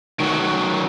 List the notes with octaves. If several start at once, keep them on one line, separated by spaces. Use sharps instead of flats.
D#3 F#3